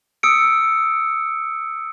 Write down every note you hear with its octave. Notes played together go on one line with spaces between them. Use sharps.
D#6 E6 C#7 D7